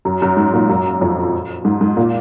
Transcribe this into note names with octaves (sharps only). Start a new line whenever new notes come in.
F#2
F#2
G#2
A#2
F#2
F2
G#2
G#2
A#2